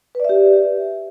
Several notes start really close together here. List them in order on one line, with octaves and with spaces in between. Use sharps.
B4 D5 E5 G4